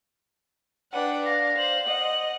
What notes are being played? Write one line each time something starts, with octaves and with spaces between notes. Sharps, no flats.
D4 B4 F#5 G5
F5 A#6
C5 F#7
D#5 F#5